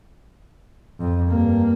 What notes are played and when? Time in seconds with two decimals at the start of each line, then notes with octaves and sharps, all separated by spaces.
1.00 F2
1.29 G2 A#3